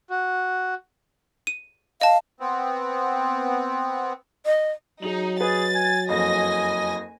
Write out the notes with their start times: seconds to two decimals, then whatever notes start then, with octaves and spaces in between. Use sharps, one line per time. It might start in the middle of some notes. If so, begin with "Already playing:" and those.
0.10 F#4
1.47 D#7
2.01 D#5 F5 A5
2.40 B3 C4
4.46 D#5
5.02 F#3 D#4 G#4 F7 F#7
5.41 G#4 B4 D#5 A6
5.74 G#5
6.09 F#1 F2 D#5 G#5 A#6